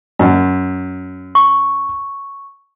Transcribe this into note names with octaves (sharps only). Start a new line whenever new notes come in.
F#2
C#6